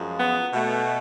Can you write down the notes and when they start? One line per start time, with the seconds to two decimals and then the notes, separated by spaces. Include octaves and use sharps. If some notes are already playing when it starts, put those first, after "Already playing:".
Already playing: F#2 F3 G#3
0.18 B3
0.51 B2 A3